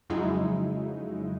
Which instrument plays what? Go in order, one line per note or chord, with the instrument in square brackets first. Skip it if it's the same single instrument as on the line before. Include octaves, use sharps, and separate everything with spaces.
[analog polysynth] F2 C#3 F#3 G#3 D#4 E4